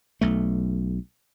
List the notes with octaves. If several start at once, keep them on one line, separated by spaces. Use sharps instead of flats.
B1 A3